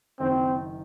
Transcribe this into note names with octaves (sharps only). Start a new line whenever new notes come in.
F#1 F#2 D#3 C4